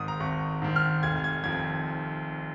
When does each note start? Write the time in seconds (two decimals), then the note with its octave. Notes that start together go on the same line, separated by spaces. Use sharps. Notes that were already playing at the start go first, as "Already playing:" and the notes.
Already playing: G#1 G#2 D#3 D#6
0.08 A#5
0.20 G#1 C#6
0.62 G#2 D#3
0.76 F6
1.03 F1 G#6
1.24 G#6
1.44 F2 D#3 G#6